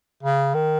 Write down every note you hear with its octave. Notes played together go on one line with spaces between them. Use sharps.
C#3
D#3